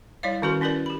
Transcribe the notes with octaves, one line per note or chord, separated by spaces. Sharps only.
G3 E4 C#5 D5 F5
D#3 C#4 F#4 A4 B4 C6
C#4 E4 A#4 B4 D5
G4 B5